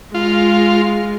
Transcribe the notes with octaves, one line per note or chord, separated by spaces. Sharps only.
G#3 F4